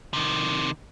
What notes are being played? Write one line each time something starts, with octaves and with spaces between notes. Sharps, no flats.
C3 D#3